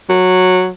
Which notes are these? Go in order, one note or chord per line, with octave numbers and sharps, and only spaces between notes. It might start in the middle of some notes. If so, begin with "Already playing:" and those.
F#3